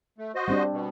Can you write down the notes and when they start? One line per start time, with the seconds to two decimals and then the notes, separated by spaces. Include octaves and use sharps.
0.18 A3
0.35 F#4 C5 D#5
0.48 G3 C4 D4
0.72 B2